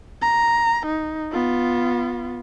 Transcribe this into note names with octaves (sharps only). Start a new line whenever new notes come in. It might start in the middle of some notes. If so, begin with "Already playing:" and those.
A#5
D#4
B3 F4